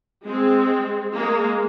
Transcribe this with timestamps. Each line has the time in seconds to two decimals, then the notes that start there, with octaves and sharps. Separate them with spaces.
0.24 G#3 C4
1.14 G#3 A#3